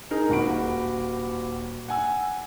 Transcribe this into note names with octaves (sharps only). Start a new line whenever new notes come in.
D#4 G#4 A#4
D#1 F#4 F#5 B5 D7
F#5 G#5 E6